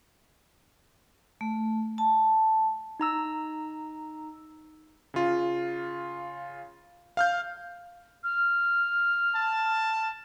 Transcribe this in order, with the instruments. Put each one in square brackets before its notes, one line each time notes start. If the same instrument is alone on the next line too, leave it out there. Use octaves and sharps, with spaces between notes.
[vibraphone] A3
A5
[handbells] D#4 A#5 E6
[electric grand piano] C#3 F4
F5 F6 G6
[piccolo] F6
[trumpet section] A5